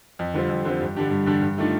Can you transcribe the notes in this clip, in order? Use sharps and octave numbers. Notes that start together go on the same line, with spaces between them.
F2
D3 G3 C4 F4
F2
D3 G3 C4 F4
G2
D3 G3 D4 G4
G2
D3 G3 D4 G4
G2
D#3 A3 D4 F4